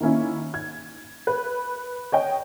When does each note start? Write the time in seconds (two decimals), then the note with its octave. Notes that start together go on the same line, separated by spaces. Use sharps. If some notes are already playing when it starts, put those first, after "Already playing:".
0.01 D#3 A#3 C#4 E4
0.54 G#6
1.27 B4
2.12 C#5 D#5 G5